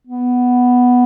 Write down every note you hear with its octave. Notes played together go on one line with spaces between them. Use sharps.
B3